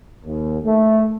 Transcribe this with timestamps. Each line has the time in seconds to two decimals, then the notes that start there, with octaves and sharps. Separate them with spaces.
0.25 D#2
0.65 A3